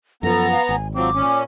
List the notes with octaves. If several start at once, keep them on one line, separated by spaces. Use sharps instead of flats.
F#2 F3 B3 A4 A#5
F5
G#1 G#5
F3 F#3 C4 D6
A#2 C#4